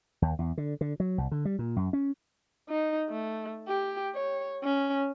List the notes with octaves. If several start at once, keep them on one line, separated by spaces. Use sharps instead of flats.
D#2
E2
D3
D3
F#3
C2
D3
G3
A#2
F#2
C#4
D#4
A3
G4
C#5
C#4